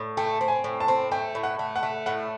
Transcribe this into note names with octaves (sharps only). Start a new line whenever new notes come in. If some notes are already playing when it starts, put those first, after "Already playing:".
Already playing: A2
A3 G5
C4
G#5
A2
A5
C4
A3 G5
A2
F#5
A3
F#5
A3
A2 F#5